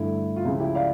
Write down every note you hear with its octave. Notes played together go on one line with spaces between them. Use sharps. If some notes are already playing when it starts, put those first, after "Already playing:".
Already playing: G2 D3 A3 E4
F4
C#2 C#3 F3 E4
E4 G4
D5 F5